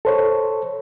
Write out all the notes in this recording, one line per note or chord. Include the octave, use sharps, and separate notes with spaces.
A4 C5 C#5